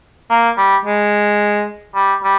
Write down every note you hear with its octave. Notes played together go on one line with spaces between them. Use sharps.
A#3
G3
G#3
G3
G3